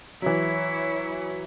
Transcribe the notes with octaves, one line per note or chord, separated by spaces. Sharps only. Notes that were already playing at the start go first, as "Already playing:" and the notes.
E3 F#3 E4 C#5